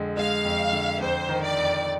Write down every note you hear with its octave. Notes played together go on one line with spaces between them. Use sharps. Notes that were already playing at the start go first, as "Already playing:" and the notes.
Already playing: F2 D3 G#3
G#3 F5
F2
D3
F2 C5
D#3
D5
F2